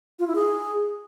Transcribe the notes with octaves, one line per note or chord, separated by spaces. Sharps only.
F4
E4
G#4